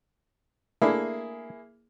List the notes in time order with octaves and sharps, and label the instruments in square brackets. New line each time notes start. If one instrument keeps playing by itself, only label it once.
[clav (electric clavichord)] A3 D4 [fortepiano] A#3 E4 G#4